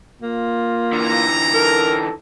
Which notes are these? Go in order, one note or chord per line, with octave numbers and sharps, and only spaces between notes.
A#3 F4
D3 E3 A#5
A4 A#4